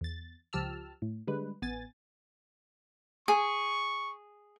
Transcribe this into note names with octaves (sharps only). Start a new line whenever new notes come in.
E2 A6
C#2 F3 G4 A5 E6 F6
A2
D3 G3 G#3 B4
A1 B3 G#5 A6
G#4 C#6